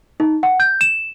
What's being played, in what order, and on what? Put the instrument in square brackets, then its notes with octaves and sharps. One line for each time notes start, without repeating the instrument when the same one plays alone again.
[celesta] D#4
F#5
G6
E7